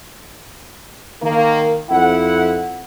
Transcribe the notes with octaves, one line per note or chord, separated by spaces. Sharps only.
D#3 A#3
F2 E4 F#5